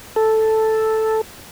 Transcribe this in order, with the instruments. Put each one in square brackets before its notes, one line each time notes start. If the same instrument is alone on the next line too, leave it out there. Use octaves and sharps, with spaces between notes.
[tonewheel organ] A4